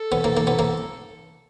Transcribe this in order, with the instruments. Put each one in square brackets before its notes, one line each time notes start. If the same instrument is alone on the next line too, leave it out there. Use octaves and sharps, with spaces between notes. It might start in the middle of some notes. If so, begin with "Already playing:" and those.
Already playing: [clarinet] A4
[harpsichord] B3
A#3
A#3
B3
A#3